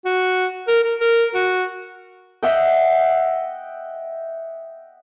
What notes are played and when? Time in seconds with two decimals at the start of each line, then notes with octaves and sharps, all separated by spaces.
0.05 F#4
0.68 A#4
0.83 A#4
1.00 A#4
1.35 F#4
2.43 D#5 E5 F#5 G5